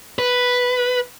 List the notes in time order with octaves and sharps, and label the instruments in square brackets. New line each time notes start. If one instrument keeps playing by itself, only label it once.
[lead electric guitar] B4